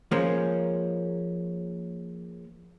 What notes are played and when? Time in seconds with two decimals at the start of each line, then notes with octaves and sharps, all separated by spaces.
0.11 F3 G#3 A#3 C#4